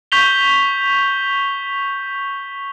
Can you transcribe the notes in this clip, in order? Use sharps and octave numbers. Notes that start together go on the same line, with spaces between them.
C#6 G6 B6 F7 G7